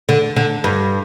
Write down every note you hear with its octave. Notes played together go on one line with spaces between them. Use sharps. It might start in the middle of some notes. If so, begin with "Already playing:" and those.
D3
D3
G2